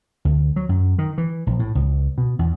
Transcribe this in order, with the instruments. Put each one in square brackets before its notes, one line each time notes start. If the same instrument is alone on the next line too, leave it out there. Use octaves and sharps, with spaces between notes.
[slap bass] D2
F#3
F#2
D#3
E3
A#1
A2
C#2
B2
E2